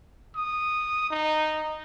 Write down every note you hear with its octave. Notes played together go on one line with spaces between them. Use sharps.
D#6
D#4